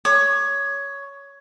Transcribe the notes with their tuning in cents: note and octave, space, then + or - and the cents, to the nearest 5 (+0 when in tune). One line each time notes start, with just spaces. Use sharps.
C#5 +10 D6 +35